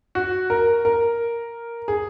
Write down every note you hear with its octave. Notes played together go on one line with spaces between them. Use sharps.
F#4
A#4
A#4
G#4